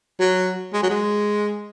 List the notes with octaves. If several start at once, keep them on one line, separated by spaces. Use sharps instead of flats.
F#3
G#3
F#3
G#3